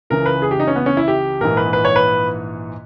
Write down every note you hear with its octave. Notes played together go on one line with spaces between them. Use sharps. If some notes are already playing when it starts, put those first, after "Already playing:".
C#2 C#3 E3 A#4
B4
G#4
G4
D#4
C#4
B3
C#4
E4
G4
A#1 G#2 E3 A#4
B4
B4
C#5
B4